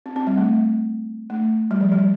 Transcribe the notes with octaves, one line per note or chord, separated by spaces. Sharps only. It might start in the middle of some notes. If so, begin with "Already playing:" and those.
C4
C4
G3
A3
A3
G3
F3
G3